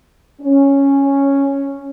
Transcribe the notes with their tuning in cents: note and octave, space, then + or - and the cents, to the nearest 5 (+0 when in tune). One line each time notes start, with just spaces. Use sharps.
C#4 -5